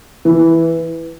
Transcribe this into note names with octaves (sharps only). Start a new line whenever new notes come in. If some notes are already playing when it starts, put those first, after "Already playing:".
E3